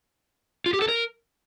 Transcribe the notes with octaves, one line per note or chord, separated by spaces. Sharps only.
F4
G4
A4
A#4